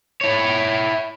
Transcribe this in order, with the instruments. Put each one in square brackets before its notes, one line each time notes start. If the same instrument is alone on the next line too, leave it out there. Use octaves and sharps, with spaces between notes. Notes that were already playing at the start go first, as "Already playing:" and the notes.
[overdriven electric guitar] E4 C#5